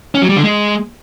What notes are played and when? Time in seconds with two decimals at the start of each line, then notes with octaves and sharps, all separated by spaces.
0.15 C#4
0.22 F#3
0.29 G3
0.36 D3
0.44 G#3